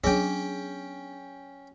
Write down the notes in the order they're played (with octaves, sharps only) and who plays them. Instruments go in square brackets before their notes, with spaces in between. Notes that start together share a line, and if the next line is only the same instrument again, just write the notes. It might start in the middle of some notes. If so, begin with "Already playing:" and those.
[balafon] F#3 C#5 [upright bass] B3 D4 [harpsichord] C#4 G5 [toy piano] G#4 D#6